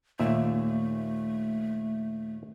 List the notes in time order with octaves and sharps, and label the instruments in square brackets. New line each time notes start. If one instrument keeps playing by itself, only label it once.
[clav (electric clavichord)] D#2 A#2 E5 [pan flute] A3